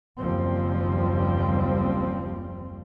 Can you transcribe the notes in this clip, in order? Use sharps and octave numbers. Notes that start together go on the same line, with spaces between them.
F#1 D#2 C#3 F3 G3 C4